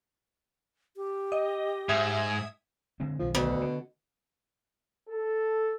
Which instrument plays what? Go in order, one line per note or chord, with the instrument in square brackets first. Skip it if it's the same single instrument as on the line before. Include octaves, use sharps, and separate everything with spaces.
[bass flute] G4
[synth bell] D#5
[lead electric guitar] G#2 [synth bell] E5 D#6 G#6
[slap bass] D3 G#3 C4
[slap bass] B1 D#3 G#3 [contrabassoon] F3
[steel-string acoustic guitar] D2 [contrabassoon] B2
[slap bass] D3
[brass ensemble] A4